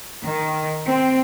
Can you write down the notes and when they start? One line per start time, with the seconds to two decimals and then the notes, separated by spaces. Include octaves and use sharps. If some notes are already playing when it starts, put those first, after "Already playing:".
0.24 D#3
0.86 C4